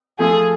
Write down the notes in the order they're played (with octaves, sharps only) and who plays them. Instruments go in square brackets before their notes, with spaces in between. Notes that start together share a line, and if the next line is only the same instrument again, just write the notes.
[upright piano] F3 A3 F4 [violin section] G#4